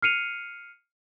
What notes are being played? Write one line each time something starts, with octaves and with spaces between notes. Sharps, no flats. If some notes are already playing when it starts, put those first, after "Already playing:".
F6 C7 C#7 D#7 F7